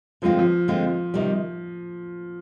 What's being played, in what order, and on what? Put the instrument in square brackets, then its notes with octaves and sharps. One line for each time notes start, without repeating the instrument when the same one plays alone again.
[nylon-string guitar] D3 G#3 C4 F4 [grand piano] F3
[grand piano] F3
[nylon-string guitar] D3 G#3 C4 F4
C3 D#3 G3